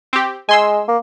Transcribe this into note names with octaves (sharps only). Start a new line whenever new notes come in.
C4 G4
G#3 G#5 C6 E6
A#3